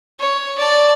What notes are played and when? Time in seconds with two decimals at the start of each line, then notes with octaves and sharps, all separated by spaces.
0.20 C#5
0.58 D5 A5